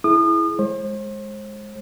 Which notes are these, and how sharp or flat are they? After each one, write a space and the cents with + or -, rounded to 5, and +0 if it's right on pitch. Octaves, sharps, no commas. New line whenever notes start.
E4 +0 G#4 +30 D#6 -40
G#3 +0 C5 +40